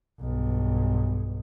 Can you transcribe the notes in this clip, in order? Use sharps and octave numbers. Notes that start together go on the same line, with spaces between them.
B1 G2